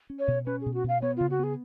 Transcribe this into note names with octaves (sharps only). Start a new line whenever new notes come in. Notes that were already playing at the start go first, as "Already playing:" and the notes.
C#4
C#5
B2
C#4 B4
B2 G#4
F#4
B2 F5
B3 C#5
C#3 F4
F#4
B3 G#4